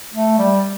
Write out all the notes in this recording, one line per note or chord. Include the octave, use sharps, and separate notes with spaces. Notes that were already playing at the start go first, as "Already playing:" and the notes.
A3
G3